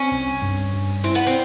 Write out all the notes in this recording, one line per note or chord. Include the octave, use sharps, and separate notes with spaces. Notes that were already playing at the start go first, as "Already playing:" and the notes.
Already playing: C4 C#4
C2
G2
G2
C4 E4
B3
C4